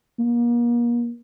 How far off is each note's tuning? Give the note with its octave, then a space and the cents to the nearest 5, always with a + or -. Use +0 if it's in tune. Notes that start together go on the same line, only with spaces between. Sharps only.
A#3 +35